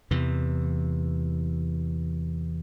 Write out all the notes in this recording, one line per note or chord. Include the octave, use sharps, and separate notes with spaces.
E2 C3 E3